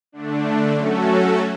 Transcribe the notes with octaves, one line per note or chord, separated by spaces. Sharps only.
D3 A3 D4
F#3 A3 C#4 F#4 A4